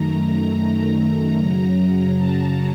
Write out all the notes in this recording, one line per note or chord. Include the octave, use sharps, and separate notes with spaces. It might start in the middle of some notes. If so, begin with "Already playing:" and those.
Already playing: F#2 D#3 A3 A#5
A#5
F#2 C#3 F#3
A5